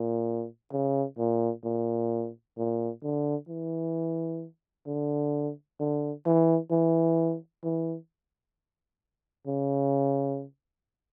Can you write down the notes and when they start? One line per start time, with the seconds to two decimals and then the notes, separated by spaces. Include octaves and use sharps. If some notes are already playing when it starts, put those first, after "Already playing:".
Already playing: A#2
0.72 C#3
1.18 A#2
1.64 A#2
2.57 A#2
3.03 D3
3.48 E3
4.87 D3
5.80 D3
6.26 E3
6.71 E3
7.64 E3
9.47 C#3